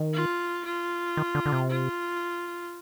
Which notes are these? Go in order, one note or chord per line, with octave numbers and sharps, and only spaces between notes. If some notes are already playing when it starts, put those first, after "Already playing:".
Already playing: D#3
F4
F4
D#3
D3
D3
C3
F4